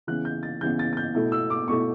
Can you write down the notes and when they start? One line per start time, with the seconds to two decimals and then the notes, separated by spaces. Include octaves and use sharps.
0.07 C#3 E3 B3 F#6
0.25 G6
0.43 A6
0.61 C#3 E3 B3 G6
0.79 A6
0.93 A6
0.97 G6
1.15 B2 A3 E4
1.32 E6
1.50 D6
1.68 B2 A3 E4 C#6